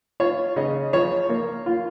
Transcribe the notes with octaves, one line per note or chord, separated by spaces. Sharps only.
F4 C#5
C#3 D#5
F3 C#5
A#3
F4